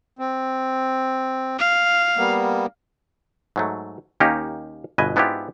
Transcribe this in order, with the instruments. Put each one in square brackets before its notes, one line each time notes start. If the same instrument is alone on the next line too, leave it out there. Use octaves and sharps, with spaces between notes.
[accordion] C4
[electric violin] F5
[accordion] G3 A#3 B3
[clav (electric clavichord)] G#2 F#3 A3
D#2 A#3 C#4 D#4 G4 A#5
G1 B2 B4 D#5 G#5
G#2 B3 D4 E4 F4 G4